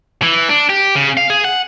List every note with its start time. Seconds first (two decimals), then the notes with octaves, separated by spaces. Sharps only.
0.22 E3
0.49 D4
0.70 G4
0.95 C#3
1.17 F5
1.30 G#4
1.44 F#5